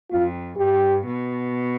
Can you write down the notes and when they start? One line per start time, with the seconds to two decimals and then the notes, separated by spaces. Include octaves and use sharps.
0.11 F2 F4
0.57 G2 G4
1.03 B2